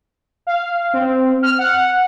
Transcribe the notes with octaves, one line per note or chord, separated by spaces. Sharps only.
F5
C4
F6
F#5